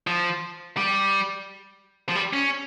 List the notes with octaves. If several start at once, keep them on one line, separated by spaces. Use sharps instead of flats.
F3
G3
F3
G3
C#4